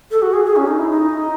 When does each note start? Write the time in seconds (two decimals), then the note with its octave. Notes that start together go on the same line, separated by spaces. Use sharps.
0.11 A4
0.22 F#4
0.33 G#4
0.46 G#4
0.56 C#4
0.67 D#4
0.79 E4
0.90 D#4